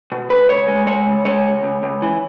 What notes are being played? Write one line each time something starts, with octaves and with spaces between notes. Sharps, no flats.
B2
C#2 B4
C#2 C#5
G#3
G#3 C#5
C#2
G#3 C#5
C#2
C#2
C#2
E3